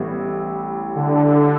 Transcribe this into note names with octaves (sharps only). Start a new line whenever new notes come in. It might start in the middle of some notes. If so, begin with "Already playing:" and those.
Already playing: A1 A2 G3 B3 E4
D3